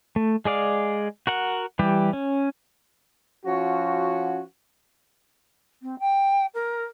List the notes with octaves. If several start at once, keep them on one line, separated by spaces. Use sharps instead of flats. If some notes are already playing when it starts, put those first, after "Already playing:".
A3
G#3 G#4 D5 F5
F#4 A#4 F#5
E3 G3 G4
C#4
F3 C#4 F#4
C4
G5
A#4